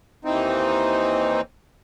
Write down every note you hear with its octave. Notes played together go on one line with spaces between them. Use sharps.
D#2 E3 C4 D#4